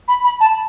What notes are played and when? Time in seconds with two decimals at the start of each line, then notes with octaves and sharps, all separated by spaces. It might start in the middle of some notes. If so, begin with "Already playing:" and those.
0.08 B5
0.24 B5
0.40 A5